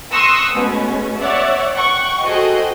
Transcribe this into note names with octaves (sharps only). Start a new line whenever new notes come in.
C6 C#6 D#6 E6 F#6 A#6
B2 G#3 A3 C#4
C#5 D5 E5 F#5
F#5 G5 C#6
F#4 G#4 A4 C5 D#5 G5